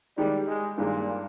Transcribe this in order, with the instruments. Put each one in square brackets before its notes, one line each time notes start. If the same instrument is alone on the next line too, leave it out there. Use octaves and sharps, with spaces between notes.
[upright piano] D#3 G#3 D#4 G4 [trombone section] G3
[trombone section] G#3
[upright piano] G2 D#3 G#3 [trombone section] A#2